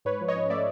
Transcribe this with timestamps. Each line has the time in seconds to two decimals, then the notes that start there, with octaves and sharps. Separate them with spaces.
0.05 G#2 B4 C#5
0.21 F3
0.28 C#5 D#5
0.36 C#4
0.50 A3 D5 E5